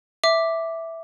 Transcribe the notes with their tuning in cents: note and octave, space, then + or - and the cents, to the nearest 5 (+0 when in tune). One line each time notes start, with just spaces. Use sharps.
E5 -5 D6 +0